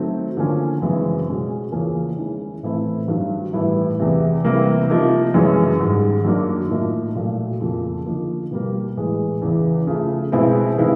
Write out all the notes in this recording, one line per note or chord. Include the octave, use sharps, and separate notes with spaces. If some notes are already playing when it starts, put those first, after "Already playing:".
Already playing: D#3 F#3 A3 C4
D3 F3 A#3 C#4
F#2 C#3 E3 G#3 C4
B2 G#3 C#4 F#4
E2 C#3 F3 A#3 C#4
D#3 G#3 C#4 E4
A2 E3 A3 C4 E4
G2 D#3 F#3
A2 E3 G3 B3 E4
E2 C3 E3
C3 E3 G3 A#3
C3 F3 A#3 D#4
F#2 C#3 E3 G#3 C#4
G#2 D#3 G3
F#2 D#3 F#3 A#3 D4
A2 F3 A#3 D#4
A#2 F#3 A3
F2 C#3 F3 A#3
D3 F3 A#3 D#4
B2 G3 A#3
A2 E3 G#3
E2 C#3 E3
C#3 F3 A3
B2 G#3 C4 E4
C3 D#3 G#3 B3 E4